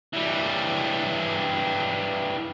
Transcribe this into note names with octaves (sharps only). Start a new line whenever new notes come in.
E3 G3